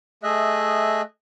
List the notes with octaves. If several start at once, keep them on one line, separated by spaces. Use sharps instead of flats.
A3 G#4 D#5 E5 F#6